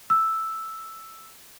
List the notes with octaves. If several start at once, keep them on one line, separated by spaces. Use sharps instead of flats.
E6